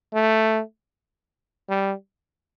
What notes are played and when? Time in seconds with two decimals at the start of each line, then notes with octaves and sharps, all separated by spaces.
0.14 A3
1.69 G3